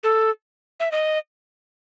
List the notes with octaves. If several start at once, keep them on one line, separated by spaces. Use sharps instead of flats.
A4
E5
D#5